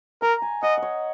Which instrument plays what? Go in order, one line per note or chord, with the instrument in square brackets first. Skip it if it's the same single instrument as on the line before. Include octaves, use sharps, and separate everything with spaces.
[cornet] A#4 [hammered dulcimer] A#5
[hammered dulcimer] G#5
[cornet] D#5 [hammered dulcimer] F#5
[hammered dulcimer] C#5 D#5